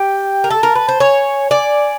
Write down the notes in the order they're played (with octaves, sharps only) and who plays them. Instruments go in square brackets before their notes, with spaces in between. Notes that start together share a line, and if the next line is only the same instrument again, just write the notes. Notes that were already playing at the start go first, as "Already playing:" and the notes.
Already playing: [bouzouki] G4 [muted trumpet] G5
[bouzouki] A#4
[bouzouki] A4 [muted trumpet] A5
[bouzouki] A#4
B4
C5
[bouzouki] C#5 [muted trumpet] G#5
[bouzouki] D5 [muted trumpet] G#5